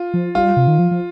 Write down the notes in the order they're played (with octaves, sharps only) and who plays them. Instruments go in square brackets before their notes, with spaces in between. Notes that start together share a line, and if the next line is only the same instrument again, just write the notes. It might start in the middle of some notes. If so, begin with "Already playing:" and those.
Already playing: [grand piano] F4
[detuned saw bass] F3
[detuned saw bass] G3 [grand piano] F4
[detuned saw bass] C3
D#3
F3
F3